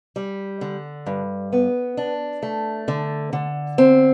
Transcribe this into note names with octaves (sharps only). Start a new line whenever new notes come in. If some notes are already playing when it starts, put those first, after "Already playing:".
G3
D3
G2
B3
D4
A3
D3
D3
C4